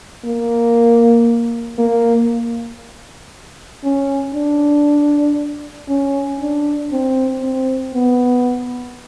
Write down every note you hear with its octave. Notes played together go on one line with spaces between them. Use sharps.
A#3
A#3
C#4
D4
C#4
D4
C4
C4
B3